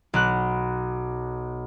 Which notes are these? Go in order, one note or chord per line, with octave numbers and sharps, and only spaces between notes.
B1 F#6